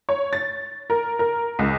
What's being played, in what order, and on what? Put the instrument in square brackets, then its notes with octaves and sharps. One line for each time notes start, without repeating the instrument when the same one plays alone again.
[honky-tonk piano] C#5
A6
A#4
A#4
C#2